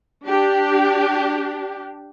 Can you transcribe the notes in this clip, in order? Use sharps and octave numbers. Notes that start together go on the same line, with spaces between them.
D4 G4